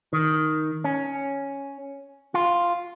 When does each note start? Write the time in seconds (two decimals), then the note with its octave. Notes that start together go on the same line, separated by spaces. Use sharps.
0.13 D#3
0.84 C#4
2.34 F4